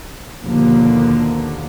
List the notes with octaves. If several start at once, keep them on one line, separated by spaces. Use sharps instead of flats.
D#2 B2 D3 F3 A#3